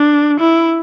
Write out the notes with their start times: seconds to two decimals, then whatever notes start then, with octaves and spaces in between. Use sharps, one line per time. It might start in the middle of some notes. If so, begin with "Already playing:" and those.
Already playing: D4
0.40 E4